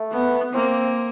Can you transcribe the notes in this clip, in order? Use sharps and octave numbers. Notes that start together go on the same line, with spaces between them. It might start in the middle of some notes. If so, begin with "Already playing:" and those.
Already playing: A3
B3
A#3 C4